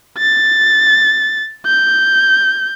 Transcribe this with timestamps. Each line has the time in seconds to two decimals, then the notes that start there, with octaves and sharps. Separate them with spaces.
0.18 A6
1.67 G6